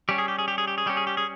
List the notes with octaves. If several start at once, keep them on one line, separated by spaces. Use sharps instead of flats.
G3 C#4 G4
G#4
G4
G#4
G4
G#4
G4
G#4
G3 C#4 G4
G#4
G4
G#4